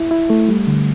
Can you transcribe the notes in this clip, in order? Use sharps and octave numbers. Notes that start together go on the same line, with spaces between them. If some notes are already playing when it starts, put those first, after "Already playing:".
Already playing: E4
E4
A3
G3
D3